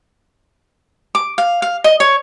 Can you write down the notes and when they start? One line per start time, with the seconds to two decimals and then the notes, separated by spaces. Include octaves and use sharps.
1.15 D6
1.38 F5
1.62 F5
1.84 D#5
2.00 C#5